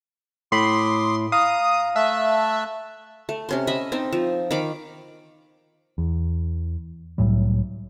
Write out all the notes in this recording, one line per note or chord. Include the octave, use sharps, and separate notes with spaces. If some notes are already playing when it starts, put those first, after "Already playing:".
A2 B5 C6 D6 D#6
F5 A#5 D#6
A3 E5 A5 F#6
A3
C3 C#4 C6
D#5 E5 B5
C4 D#4
F3
D#3 F5 B5 D6
E2
C2 A2 F#3 G3